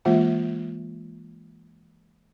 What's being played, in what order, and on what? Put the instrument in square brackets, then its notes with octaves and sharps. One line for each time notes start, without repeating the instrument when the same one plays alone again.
[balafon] E3 G#3 A#3 F4 E5